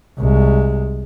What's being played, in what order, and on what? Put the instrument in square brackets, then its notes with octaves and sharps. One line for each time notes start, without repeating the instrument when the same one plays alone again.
[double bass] C2 G#3